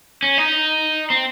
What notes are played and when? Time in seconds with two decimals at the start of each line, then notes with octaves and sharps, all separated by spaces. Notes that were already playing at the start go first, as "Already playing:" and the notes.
0.23 C#4
0.38 D#4
1.10 C4